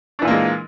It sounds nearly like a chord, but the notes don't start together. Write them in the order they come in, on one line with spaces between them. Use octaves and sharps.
D4 E3 A#2 A#3 G#3